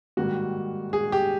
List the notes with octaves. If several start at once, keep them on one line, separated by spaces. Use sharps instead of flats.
G#2 D#3 G3 A#3 F#4
G#4
G4